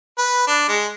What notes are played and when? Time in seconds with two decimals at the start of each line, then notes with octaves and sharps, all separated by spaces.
0.18 B4
0.47 D4
0.68 G#3